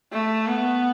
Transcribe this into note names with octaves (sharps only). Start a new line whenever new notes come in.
A3
B3